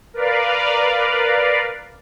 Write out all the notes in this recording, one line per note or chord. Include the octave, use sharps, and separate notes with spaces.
A#4 B4 D5 F5